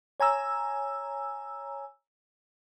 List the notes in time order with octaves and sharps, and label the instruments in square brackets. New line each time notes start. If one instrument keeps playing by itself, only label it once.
[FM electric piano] C#5 G#5 A#5 E6